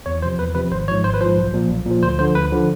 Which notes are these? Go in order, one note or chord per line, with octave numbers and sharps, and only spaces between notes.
E2 C#5
C3 F3 C5
E2 B4
C3 F3 B4
G#1 C5
G#2 F3 C#5
G#1 C5
B4
G#2 F3 C5
B1
A#2 F3
B1
A#2 F3
D2 C5
D3 F3 C5
D2 B4
D3 F3